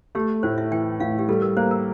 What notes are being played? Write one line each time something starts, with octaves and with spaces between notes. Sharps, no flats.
A3 G4
A2 C5
E5
E3 G5
A2 F5
G4
G3 A4
A#4
A#3 C5
A#4